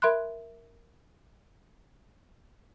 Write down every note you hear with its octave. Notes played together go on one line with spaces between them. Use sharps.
A#4 E5 B5 C6 F#6